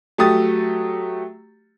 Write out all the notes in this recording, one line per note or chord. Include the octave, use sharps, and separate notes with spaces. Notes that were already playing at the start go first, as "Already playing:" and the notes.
F#3 A3 G4 D#6 A6